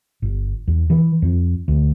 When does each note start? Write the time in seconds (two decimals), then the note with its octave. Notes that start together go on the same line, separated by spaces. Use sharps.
0.22 G1
0.68 E2
0.90 E3
1.22 F2
1.68 D2